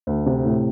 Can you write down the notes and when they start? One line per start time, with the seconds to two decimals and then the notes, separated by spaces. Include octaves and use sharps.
0.07 D2
0.26 C3
0.45 A2